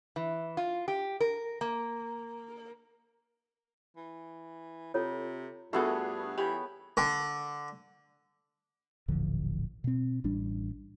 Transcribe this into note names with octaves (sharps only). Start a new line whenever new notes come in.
E3
F4
G4
A#4
A#3
E3
C3 F4 A4 C#5
G2 A3 B3 D4 F4 F#4 G#4 A4
E3 G4 C#5 B5
D3
D#1 A1 D3 F3
B2 C4
A1 G3 D4